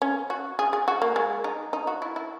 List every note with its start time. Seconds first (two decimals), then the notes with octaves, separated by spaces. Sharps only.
0.02 C#4
0.30 F#4
0.59 G#4
0.73 G#4
0.88 F#4
1.02 A#3
1.16 G#3
1.44 D#4
1.73 D#4
1.87 F#4
2.02 E4
2.16 E4